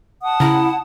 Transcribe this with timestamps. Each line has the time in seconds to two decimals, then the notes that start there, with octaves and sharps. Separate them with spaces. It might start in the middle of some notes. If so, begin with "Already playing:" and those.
0.23 F#5 A5 D#6
0.40 C#3 E4 F5 A#5